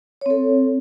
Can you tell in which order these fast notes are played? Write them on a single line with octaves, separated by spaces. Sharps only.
C#5 C4 A4